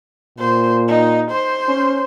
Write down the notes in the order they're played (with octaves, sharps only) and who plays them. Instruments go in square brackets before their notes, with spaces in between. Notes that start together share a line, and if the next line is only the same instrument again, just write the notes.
[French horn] A#2 [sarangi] C5
[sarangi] D#4
C5
[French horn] C#4